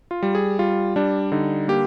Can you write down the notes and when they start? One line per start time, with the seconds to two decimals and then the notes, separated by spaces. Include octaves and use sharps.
0.11 F4
0.23 G3
0.35 G#4
0.59 G3 F4
0.96 G3 D4
1.32 D3 D#4
1.68 A#3 G4